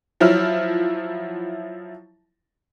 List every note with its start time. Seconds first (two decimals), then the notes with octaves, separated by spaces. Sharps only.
0.20 F3 F#3 E4 F6